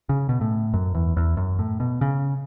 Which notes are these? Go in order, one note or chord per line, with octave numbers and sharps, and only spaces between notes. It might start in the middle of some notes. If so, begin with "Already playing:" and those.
C#3
B2
A2
F#2
E2
E2
F#2
A2
B2
C#3